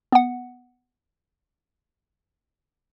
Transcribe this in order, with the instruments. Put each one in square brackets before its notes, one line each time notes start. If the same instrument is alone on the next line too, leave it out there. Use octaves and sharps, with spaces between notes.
[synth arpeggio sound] B3 F#5